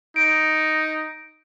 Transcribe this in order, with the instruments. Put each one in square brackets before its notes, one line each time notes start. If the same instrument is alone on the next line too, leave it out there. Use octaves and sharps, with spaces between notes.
[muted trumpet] D#4 [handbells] D7